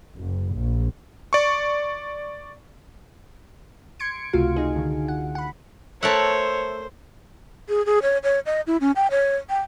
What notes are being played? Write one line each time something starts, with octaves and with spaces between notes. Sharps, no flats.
F#1
A#1
D5 C#6
C6 G#6 C#7 D7
C#2 C3 A3 F4 F#4 F5
D#4 G#4
D3 D#3
F#5
F#5 B5
A3 A#4 C5 C#5 E5 F#5 A5
G#4
G#4
C#5
C#5
D#5
E4
C#4
G5
C#5
G5